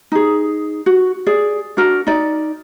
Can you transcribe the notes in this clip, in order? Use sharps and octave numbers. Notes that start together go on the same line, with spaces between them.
D#4 G#4
F#4
G#4 D5
D4 F#4 A#4
D#4 D5